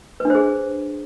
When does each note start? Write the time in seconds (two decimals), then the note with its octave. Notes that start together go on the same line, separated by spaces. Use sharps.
0.20 B4
0.25 D4
0.30 C5
0.35 G#4